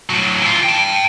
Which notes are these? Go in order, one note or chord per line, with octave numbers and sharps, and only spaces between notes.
A2 F#3
E3 F4
G5 A5